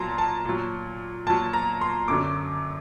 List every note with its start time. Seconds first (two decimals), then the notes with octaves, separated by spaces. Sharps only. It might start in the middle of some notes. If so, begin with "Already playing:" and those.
Already playing: A#2 F#3 A5 A#5 C6
0.18 A5
0.45 A#2 F#3
1.26 A#2 F#3 A5
1.53 A#5
1.81 C6
2.08 F#2 D3 F#3 D6